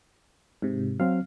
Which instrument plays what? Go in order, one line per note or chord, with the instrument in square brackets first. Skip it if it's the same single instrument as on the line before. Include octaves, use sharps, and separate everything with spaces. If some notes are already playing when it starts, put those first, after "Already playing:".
[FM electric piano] G#2 C3
[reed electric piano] F#3 C4 [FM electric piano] F5